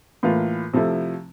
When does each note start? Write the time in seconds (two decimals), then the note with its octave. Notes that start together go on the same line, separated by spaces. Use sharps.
0.23 A2 E3 A#3 F4
0.73 C3 F3 A3 E4